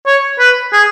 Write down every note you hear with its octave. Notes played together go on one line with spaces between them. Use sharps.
C#5
B4
G#4